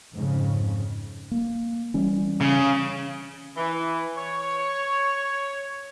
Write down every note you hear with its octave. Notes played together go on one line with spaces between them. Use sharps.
F2 G#2 C#3
A#3
E3 G3 C#4
C#3
E3
C#5